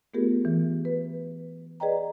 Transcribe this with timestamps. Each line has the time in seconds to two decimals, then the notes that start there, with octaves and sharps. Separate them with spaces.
0.14 A3 B3 F4 G4 G#4 A#4
0.45 E3
0.85 B4
1.80 G#4 B4 D5 D#5 G5 A#5